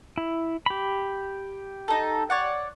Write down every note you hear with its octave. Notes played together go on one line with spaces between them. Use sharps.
E4
G4 B5
D#4 A4
C#5 D5 F#5